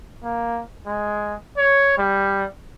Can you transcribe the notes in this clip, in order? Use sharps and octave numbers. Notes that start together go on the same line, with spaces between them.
A#3
G#3
C#5
G3